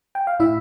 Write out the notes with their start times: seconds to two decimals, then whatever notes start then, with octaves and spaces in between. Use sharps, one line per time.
0.15 G5
0.27 F5
0.39 A2 E4 E5